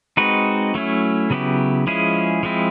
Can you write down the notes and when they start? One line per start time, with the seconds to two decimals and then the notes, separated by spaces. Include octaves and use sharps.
0.17 G#3 C4 D#4 F#4 B4
0.75 F#3 A3 C#4 E4
1.30 C#3 F#3 B3 E4 G4
1.87 F3 G#3 C#4 E4 G#4
2.43 F3 G#3 C4 E4